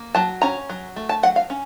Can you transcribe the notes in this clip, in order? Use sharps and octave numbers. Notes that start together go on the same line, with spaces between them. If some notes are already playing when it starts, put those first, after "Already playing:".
Already playing: A#3
F#3 A5
C#4 A#5
F#3
A3
A5
F#3 F#5
F5
C#4